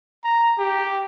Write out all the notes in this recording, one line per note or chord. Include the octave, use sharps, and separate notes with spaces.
A#5
G4